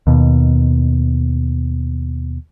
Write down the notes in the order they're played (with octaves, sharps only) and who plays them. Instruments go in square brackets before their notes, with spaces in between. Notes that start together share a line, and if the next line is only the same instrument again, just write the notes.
[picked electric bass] D#2 B2